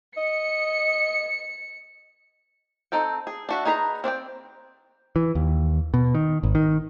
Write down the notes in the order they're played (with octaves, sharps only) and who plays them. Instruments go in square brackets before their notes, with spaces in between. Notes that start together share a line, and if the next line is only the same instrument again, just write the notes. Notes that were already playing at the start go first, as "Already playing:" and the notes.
[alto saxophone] D#5 [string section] C#7
[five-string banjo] C4 D#4 A4 G5
G#4
D4 F#4 E5
D#4 G#4 B4 C5 A#5
C4 D4 D5 G5
[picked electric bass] E3
D#2
B2
D#3
G#1
D#3